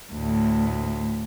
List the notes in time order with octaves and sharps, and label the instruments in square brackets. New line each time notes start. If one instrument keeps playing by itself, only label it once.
[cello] D2 A2